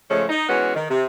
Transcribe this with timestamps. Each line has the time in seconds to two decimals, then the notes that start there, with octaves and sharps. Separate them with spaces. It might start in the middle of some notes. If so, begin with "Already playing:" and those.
0.09 C#3 F3 G#3 A3 C#4
0.29 D#4
0.49 E3 G#3 B3 C#4 F#4
0.75 D#3
0.90 C3